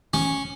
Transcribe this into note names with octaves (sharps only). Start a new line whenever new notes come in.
C#4